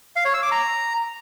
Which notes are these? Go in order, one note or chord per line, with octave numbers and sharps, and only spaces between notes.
F5
C#5
E6
D6
A#5